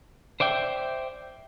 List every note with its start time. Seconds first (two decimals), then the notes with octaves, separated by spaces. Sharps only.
0.40 C5 D5 E5 G5